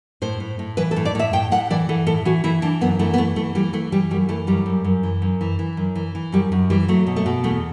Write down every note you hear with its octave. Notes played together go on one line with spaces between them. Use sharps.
A2 C5
A2
A2
E3 B4
A4
A2
D5
A2 E5
A2 G5
A2 F#5
E3 D5
E3 A4
A2 A4
E3 F#4
E3 E4
E3 D4
F#2 B3
E3 A3
B3
E3 A3
E3 A3
E3 G3
E3 A3
E3 G3
F#2 G3
E3 A3
F#2 G3
F#2
F#2
E3
F#2
E3
E3
F#2
E3
E3
F#2 G3
F#2
E3 G3
F#3 A3
B2
A3
B2
E2 A3